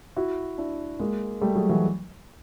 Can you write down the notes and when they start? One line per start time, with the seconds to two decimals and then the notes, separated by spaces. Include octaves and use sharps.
0.16 E4 F#4
0.58 D4 E4
0.99 G#3 A#3
1.41 G3 A3
1.55 F#3 G#3
1.69 E3 F#3